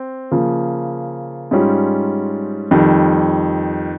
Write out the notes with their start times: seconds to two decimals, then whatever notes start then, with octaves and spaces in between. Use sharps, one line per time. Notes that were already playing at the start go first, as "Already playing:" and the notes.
Already playing: C4
0.31 C#3 F3 A#3
1.51 G#2 G3 C#4 F4
2.71 F2 D#3 G3